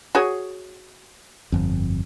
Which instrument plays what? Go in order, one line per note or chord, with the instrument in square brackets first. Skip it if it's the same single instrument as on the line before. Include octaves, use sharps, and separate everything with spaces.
[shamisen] F#4 G#4 C#5
[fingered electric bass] G1 F2